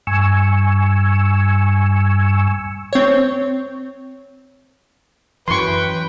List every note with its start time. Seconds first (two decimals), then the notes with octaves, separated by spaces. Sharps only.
0.07 G2 G#5 C#6 E6
2.93 C4 C#5
5.48 F#2 E3 B4 G5 C6 C#6